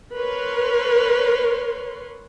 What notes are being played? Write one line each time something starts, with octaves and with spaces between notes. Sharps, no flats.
A#4 B4 C#5 C6